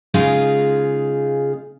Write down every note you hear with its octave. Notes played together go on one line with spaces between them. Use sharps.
C#3 G#3 D#4 F4 G#4 F5